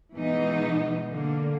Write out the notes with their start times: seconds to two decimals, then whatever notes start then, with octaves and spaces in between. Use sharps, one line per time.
0.15 B2 E3 G#3 B3 D#4
1.09 D3 A#3